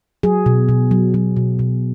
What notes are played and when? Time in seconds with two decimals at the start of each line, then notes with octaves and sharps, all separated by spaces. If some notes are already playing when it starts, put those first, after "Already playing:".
0.23 F#3 G#4
0.46 B2
0.69 B2
0.91 F#3
1.14 F#3
1.36 B2
1.59 B2